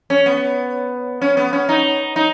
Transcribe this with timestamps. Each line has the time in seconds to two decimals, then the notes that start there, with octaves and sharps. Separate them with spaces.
0.10 C#4
0.26 B3
1.21 C#4
1.37 B3
1.53 C#4
1.69 D#4
2.16 D#4